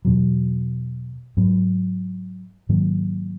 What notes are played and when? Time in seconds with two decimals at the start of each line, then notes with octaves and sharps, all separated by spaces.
0.05 E2 B2 F#3
1.37 G#2 F#3 B3
2.69 G#2 D#3 F#3 A#3